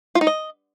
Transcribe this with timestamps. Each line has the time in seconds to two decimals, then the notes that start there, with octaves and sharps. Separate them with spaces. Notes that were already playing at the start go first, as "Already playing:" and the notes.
0.15 F4
0.21 D#4
0.27 D#5